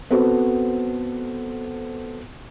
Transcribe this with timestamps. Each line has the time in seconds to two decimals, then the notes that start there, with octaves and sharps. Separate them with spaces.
0.11 B3 C4 F#4 A4 C5